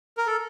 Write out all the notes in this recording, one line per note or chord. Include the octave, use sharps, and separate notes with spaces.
A#4
A4